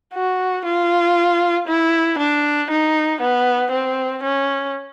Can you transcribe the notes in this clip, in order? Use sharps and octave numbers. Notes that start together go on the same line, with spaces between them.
F#4
F4
E4
D4
D#4
B3
C4
C#4